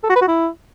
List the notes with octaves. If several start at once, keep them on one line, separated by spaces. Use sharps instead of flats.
A4
F#4
B4
F#4
E4